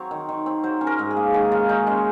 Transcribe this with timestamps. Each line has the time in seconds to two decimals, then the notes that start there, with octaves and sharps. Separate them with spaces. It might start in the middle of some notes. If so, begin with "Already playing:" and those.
Already playing: F#3 C4 C#5
0.11 D#3
0.29 D#3
0.46 C4
0.63 F#3 C5
0.81 C#4
0.87 A#4
0.99 G#2
1.11 G#4
1.17 A#3
1.34 D#3 G#4
1.52 C#4 F4
1.69 F#2 D#4
1.87 G#3 C#4